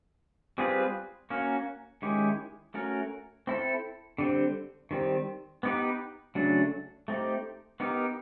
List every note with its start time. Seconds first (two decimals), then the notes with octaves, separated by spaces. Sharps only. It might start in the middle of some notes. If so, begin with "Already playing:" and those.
0.58 G3 C4 F4 G#4 B4
1.30 A#3 C#4 F#4 A#4
2.02 D#3 G#3 C#4 E4 G4
2.74 A3 C#4 F#4 A#4
3.47 C4 E4 A4
4.18 D3 G3 C4
4.91 D#3 G3 C4
5.63 B3 D#4 G4 B4
6.35 C#3 F#3 A3 D4
7.08 A3 C4 D#4 G4
7.80 B3 D#4 G4 A#4